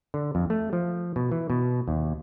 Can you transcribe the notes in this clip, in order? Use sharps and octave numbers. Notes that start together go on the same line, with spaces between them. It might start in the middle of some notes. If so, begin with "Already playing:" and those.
D3
F2
A3
F3
B2
E3
B2
D#2